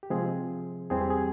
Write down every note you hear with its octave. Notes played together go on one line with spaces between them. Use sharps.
G4
C3 F3 G#3 C4 G#4
E2 E3 G3 C4 G#4
G4
G#4